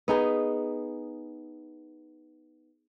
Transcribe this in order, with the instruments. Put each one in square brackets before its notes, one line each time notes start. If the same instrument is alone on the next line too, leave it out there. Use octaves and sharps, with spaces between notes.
[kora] B3 D#4 G#4 B4